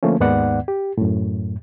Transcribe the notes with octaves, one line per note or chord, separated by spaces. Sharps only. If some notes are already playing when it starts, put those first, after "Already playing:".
D3 F3 A3 A#3 C#4
D#2 G#2 D#3 B3 D5 F#5
G4
F#2 A2